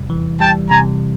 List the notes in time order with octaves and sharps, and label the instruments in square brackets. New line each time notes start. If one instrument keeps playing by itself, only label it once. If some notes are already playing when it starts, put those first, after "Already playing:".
Already playing: [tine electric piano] E2 C3 G3
E3
[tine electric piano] G3 [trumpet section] G5 A5
[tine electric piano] C3 [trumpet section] G#5 A#5